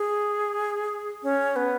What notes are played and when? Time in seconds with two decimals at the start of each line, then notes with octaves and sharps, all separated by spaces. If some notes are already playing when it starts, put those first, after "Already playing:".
Already playing: G#4
1.23 C#4
1.56 B3